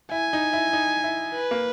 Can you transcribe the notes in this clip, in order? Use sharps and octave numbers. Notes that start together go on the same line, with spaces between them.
E4 G#5
D#4
E4
D#4
E4
B4
A#3